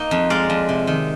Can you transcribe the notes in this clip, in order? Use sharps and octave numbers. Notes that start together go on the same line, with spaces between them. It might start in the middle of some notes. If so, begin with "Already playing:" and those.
Already playing: A#3 D#4
F2
G#3 D5 F5
F2
C3
D#3